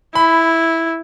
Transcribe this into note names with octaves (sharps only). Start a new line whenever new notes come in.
E4 B5